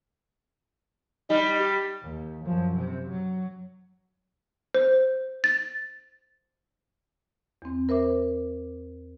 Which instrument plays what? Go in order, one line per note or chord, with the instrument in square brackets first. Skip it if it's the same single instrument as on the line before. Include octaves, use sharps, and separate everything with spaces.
[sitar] G3 [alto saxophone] D#4
[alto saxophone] G4
[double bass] D#2
F#2 F3
C3
F#3
[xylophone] C5
A6
[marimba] E2 C4
A#4 C5 E5 D6